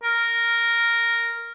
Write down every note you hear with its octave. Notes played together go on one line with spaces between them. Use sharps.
A#4